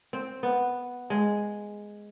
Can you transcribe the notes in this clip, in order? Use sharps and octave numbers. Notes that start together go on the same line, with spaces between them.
C4
B3
G#3